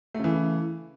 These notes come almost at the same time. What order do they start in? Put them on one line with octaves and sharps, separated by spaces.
A3 C#3 E3